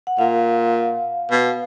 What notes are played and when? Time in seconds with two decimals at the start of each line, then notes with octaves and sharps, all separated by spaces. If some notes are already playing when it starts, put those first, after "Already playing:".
0.07 F#5
0.19 A#2 F5
1.31 B2